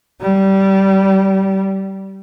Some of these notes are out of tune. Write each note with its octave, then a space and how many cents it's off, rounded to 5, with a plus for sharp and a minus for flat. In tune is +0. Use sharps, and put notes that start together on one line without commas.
G3 -20